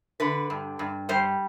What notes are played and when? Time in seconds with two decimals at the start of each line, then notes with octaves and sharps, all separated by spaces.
0.20 D3 B4
0.50 G2
0.79 G2
1.09 G3 C5